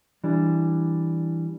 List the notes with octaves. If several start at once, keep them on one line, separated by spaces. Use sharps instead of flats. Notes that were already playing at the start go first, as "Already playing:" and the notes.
E3 G3 D4